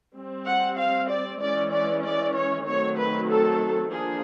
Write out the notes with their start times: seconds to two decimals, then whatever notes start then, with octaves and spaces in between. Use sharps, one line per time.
0.15 G3 C4
0.45 F#5
0.78 F5
1.09 D5
1.41 E3 G#3 C#4 D5
1.71 D5
2.04 D5
2.34 C#5
2.66 D#3 F#3 A3 C4 C#5
2.97 B4
3.29 A4
3.91 F3 A#3 D4 G#4